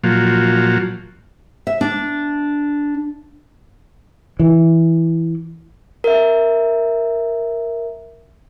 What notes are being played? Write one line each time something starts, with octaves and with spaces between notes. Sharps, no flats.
A#2 F3 F#3
E5
D4
E3
A#4 E5